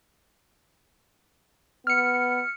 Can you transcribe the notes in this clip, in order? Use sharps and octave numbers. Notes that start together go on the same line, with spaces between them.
B3 F6 C#7